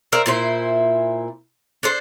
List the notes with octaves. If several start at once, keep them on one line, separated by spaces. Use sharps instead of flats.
A#4 C5 D5 E5
A#2 E4 C5
D4 A4 C5